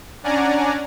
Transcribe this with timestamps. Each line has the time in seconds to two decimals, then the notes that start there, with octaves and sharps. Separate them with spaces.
0.23 C#4 D4 D5 F#5 G#5 A#5